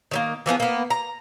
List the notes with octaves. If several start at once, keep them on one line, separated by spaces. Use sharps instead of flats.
D#3 F#3 A#3
E3 F3 B3 G#4
A#3 B3
A#5